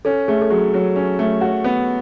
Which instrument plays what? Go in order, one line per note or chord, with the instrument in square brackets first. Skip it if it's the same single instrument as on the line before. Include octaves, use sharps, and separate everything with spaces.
[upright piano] C#4 [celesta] A4
[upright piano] A3 [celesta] G#4
[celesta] A4
[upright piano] F#3 [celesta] G#4
[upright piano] F#3
C#4
A3
F#4
B3